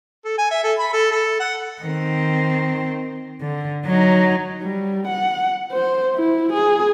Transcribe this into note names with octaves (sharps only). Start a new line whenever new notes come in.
A4
G#5
E5
A4
B5
A4
A4
F#5
D#3 C4
D3
F#3 D#4
G3
F#5
C5
E4
G#4